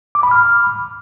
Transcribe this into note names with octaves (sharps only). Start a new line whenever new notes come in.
D6
B5
F6